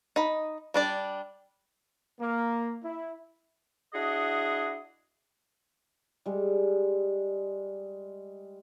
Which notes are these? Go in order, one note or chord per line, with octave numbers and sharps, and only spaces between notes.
D#4 B5
G3 D4 D5
A#3
E4
D4 E4 F#4 G#4 D#5 F#5
G3 G#3